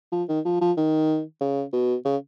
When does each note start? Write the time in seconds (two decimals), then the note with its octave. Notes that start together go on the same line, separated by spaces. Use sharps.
0.12 F3
0.29 D#3
0.45 F3
0.61 F3
0.77 D#3
1.41 C#3
1.73 B2
2.05 C#3